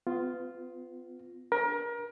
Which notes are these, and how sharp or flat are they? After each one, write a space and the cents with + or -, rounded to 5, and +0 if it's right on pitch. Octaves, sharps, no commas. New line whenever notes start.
B3 +35 F4 +0
D4 +0 A#4 +30